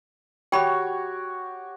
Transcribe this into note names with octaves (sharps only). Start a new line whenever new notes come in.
F#4 G4 C#5 G5 B5